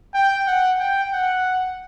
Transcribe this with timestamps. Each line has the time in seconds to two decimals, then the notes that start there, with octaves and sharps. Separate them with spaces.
0.14 G5
0.47 F#5
0.80 G5
1.13 F#5